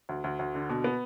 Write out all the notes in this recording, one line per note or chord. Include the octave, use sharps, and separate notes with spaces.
D2
D2
D2
D3
B2
B3